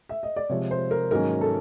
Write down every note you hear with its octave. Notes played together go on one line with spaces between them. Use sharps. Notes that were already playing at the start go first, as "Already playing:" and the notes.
E5
D#5
D5
C3 F3 G#3 C#5
C5
A#4
G#2 D#3 F#3 A#3 C#4 A#4
A4